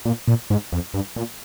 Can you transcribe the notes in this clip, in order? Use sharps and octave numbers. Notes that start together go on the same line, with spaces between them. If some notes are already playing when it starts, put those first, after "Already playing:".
A#2
A#2
G#2
F2
G2
A#2